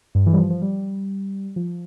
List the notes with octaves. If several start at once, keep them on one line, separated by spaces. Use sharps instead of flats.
G2
E3
G3
F3
F3
G3
F3